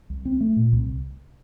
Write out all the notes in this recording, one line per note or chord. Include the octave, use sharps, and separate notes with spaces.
C2
C4
A3
A#2
C2